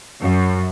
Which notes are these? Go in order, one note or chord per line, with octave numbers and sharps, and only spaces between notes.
F#2